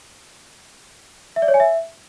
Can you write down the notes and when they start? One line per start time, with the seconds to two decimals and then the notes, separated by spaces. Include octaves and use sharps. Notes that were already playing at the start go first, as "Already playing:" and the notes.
1.36 E5
1.42 D5
1.48 C#5
1.54 G#5
1.60 E5